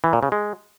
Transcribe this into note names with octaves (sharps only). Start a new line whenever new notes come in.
E3
A#2
C#3
G#3